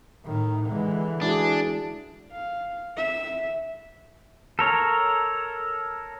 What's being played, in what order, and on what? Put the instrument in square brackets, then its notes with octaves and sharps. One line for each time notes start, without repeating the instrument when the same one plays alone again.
[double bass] A2 D#3
[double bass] D3 E3 [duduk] G#3
[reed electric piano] G#3 E4 F#4 [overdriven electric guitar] D4 [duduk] G#4
[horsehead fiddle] F5
E5
[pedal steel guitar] A4 A#4 C#5